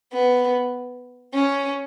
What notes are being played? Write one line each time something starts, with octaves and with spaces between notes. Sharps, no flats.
B3
C#4